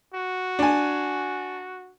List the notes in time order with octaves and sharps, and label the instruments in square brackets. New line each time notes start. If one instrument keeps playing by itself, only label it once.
[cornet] F#4
[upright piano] D4 G#5